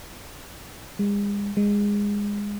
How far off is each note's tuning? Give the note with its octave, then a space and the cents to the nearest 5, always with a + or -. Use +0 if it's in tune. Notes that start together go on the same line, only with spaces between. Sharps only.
G#3 -40
G#3 -20